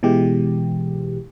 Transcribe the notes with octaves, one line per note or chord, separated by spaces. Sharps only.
B2 E3 G#3 G4